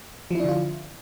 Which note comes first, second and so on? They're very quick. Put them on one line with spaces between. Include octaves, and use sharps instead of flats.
F3 E4 D4 D3 F4